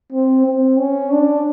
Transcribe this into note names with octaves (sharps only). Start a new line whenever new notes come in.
C4
C4
C#4
D4